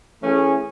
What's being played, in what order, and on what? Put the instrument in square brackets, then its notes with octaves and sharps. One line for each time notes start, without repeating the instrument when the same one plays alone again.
[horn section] E3 A3 C#4 G#4